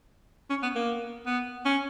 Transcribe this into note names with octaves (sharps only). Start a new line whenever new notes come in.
C#4
B3
A#3
B3
C#4